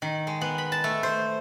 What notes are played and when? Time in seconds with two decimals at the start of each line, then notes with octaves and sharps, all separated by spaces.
0.02 D#3
0.27 G#3
0.41 B3
0.58 B5
0.72 A5
0.84 A3
1.03 C5